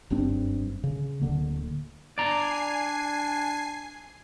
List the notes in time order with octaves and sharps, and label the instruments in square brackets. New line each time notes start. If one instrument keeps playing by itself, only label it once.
[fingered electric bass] F#1 G2 C4 D4
C#3
D1 D3 A#3
[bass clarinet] D4 [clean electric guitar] D5 A#5 [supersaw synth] G#5 C7